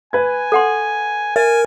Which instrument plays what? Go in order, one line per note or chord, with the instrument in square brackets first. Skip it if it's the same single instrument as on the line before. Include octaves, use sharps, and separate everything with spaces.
[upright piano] B4 G#6 [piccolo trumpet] G#5
[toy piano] A4 F#5 C6
[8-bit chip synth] A#4 [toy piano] E5 [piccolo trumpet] G#5